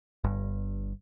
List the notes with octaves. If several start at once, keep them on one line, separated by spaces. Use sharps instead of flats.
G1 G2